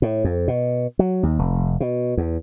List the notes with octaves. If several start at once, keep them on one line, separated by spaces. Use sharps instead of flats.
A2
F2
B2
F#3
D#2
F1
B2
E2